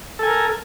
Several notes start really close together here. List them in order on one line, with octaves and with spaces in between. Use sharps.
A4 G#5 A#4